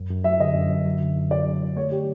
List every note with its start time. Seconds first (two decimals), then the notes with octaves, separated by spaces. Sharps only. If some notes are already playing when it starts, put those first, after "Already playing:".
Already playing: F#2
0.10 F#2
0.24 F#3 E5
0.40 D3 D#5
0.55 F#2
0.70 F#2
0.85 F#3
1.01 D3
1.16 F#2
1.31 F#2 D5
1.46 F#3
1.61 D3
1.76 A3 C#5
1.91 G4